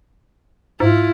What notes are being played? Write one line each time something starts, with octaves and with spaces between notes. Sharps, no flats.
G#2 E4 F4